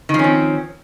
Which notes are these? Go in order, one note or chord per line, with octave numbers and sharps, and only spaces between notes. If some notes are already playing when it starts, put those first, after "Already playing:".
D#3 F3 C4 C#4